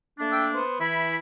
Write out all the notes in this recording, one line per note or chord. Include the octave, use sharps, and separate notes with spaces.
A3 A#3 D4
E5 G5
B3 C5
E3 E4 B5